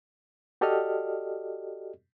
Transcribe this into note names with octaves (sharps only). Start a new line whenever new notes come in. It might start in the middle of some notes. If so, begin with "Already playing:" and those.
F#4 G4 A4 D5 D#5 F6